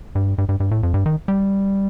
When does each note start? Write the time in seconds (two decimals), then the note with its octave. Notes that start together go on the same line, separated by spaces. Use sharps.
0.15 G2
0.38 G2
0.49 G2
0.60 G2
0.71 A2
0.83 F2
0.94 G2
1.06 D#3
1.28 G3